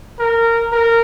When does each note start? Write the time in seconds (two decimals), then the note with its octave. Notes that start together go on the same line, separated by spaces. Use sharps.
0.20 A#4
0.72 A#4